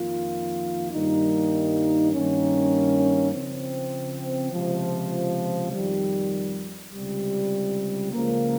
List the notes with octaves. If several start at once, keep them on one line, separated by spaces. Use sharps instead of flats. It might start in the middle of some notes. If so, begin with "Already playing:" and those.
Already playing: F2 D#3 A#3 F4
G2 D#3 G3 A#3 D#4
G2 D#3 A#3 C#4
C#3 F3 C4
C#2 C3 F3
F2 D#3 G3
C#2 C3 G3
C#2 C#3 F3 A#3